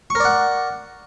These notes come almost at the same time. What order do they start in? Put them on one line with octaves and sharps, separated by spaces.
C#6 A#4 D5 F#5